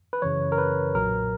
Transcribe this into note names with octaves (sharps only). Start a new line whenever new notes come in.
B4
F#2 C#3 E3 C#5
A#4
B4
B1 A#2 F#3 A#4